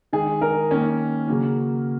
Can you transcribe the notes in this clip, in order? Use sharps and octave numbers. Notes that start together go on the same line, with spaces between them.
D#3 G#3 G#4
A#4
D#3 A#3 C#4
C#3 F#3 A#3